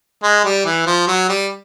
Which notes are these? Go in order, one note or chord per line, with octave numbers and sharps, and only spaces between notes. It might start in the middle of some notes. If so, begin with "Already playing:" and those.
G#3
G3
E3
F3
F#3
G3